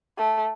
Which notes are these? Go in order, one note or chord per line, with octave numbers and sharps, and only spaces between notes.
A3